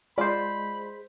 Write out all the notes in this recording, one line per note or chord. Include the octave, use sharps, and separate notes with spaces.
G#3 F4 C5 D5 B5